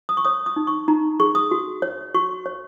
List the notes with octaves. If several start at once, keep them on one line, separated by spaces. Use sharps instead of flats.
D#6
C#6
C#5 D#6
D#6
D#4
C#6
D#4 A#5
G#4 C#6
D#6
F#4
C#5
F#4 C#6
C#5